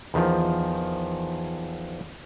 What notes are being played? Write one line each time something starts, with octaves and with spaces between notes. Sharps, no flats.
E2 D#3 F3